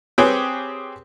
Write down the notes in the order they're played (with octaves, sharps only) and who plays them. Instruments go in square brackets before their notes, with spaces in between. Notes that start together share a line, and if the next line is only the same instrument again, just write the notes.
[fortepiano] C4 G4 G#4 B4 C#5